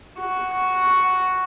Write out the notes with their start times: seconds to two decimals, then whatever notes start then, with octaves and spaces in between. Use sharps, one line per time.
0.20 F#4